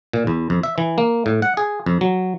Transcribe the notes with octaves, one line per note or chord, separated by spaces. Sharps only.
A#2
E2
F2
E5
E3
A#3
A2
F#5
G#4
F2
F#3